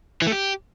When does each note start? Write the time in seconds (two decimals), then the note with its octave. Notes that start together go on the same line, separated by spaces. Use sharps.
0.22 E3
0.27 A3
0.32 G4